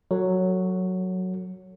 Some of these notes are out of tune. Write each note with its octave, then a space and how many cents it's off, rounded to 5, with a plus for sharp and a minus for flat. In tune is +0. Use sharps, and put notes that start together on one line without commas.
F#3 +0 A4 +25